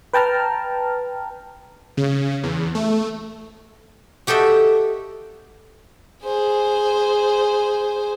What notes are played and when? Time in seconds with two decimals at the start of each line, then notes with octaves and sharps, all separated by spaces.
0.14 B4 G5 A5 A#5 F6
1.97 C#3
2.44 E2
2.75 A3
4.27 F#4 G4 A4 D#5 E5
6.23 G#4 C5